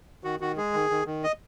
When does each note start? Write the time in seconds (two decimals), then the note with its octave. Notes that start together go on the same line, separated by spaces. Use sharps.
0.24 D#3 F#4
0.40 D#3 F#4
0.57 G#3 G#4
0.73 D#3
0.90 D#3
1.06 D#3
1.23 D#5